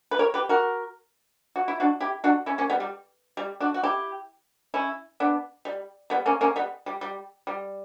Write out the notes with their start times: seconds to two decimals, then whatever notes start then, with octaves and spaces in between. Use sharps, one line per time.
0.11 B4
0.19 A#4 C#5
0.34 G4 B4
0.49 F#4 A#4
1.56 F#4
1.68 E4
1.80 D4 F#4
2.00 E4 G4
2.24 D4 F#4
2.46 C#4 E4
2.58 A#3 C#4
2.70 G3 B3
2.80 G3
3.37 G3
3.60 D4 F#4
3.74 F#4
3.83 E4 G4
4.74 C#4 E4
5.20 B3 D4
5.65 G3
6.10 G3 B3
6.26 A#3 C#4
6.41 A#3 C#4
6.56 G3 B3
6.86 G3
7.01 G3
7.47 G3